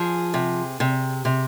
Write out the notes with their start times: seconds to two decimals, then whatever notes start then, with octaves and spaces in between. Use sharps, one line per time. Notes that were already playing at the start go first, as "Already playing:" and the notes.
Already playing: F3 G#4
0.34 C3
0.80 C3
1.25 C3